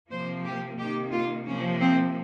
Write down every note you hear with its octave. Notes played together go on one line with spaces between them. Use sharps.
C3 F3 A#3 C5
G4
C3 D#3 A#3 G4
F4
C3 F3 A#3 C#4
C4